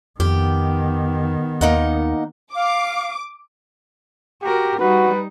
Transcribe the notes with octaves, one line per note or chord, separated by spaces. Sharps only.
F2 D#3 B3 G4
D#2 A#3 D#4 F#5
F5 D6
F#4 G4 A#4
G3 D#4 F#4 B4